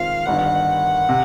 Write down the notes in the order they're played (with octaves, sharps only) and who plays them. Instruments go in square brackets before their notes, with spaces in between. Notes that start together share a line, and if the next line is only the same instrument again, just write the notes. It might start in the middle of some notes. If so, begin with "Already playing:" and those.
Already playing: [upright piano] D#3 G#3 C4 F4 [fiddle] F5
[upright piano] G1 G2 D#3 [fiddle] F#5
[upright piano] C3